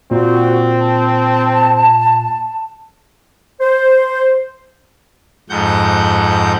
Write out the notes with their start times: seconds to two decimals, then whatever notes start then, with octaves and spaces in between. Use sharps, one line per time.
0.11 A#2 C4 F#4
0.80 A5
3.61 C5
5.50 F2 G#2 F#5 G6